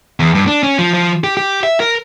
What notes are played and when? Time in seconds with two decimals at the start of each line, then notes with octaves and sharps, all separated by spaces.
0.20 E2
0.35 G2
0.47 D4
0.63 C#4
0.79 F3
0.94 F3
1.24 G4
1.37 G4
1.63 E5
1.80 A#4